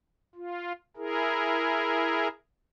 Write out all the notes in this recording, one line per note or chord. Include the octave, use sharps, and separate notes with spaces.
F4
E4 G#4 A#4